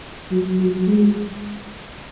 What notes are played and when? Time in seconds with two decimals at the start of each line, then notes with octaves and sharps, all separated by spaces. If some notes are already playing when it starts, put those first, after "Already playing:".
0.31 F#3
0.60 F#3
0.87 G#3